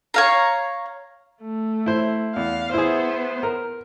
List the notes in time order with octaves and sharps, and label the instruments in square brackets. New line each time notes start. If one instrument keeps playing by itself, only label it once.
[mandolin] C#5 F5 A#5
[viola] A3
[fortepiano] E4 C5
[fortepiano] E2 [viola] F5
[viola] B3 C5 [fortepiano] E4 G#4
[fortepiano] A#4